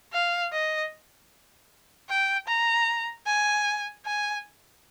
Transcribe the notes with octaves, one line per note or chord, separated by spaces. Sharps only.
F5
D#5
G5
A#5
G#5
G#5